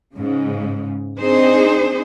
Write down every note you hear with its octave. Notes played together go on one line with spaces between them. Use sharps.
G#2 C#3
C4 D4 D#4 G#4 C5